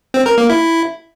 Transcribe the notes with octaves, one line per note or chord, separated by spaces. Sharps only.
C4
A#4
A#3
E4